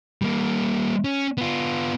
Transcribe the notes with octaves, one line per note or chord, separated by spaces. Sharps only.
G3 A#3
C#4
B3 F4